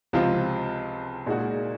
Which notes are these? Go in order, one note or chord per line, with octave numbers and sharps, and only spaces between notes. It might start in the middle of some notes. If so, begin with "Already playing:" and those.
C#2 C3 F3 C4 F4
A#2 G#3 D#4 F#4